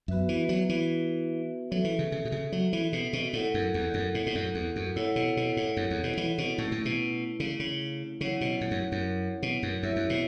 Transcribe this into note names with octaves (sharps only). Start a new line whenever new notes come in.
F#2 B3 F#4 B4 E5
E3
F#3
E3
F#3 C#4 A4 E5
E3
C#3
C#3
B2
C#3
F#3
E3
B2
B2
A2 E4 A4 F#5
F#2
E2
F#2
A2
A2
F#2
E2
F#2
A2 E4 A4 C#5 F#5
B2
B2
A2
F#2
E2
B2
E3
B2
A2 A3 C#4 E4
A2
B2
C#3
C#3
C#3 F#3 C#4 E4 C#5 F#5
B2
A2
F#2
F#2
B2
F#2
F#2 E4 C#5 E5
F#2
B2